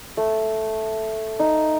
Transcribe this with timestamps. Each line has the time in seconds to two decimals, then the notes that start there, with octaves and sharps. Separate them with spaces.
0.17 A3
1.39 D#4